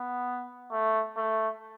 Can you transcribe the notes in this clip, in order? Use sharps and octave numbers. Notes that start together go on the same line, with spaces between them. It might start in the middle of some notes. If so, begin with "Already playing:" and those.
Already playing: B3
A3
A3